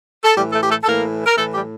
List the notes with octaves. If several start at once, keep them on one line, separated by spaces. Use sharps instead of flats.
A4
A2 E3 G3 G4
A3 A4
G4
A3 A4
A4
A2 E3 A#3 A#4
A#4
A2 E3 A3 A4
G3 G4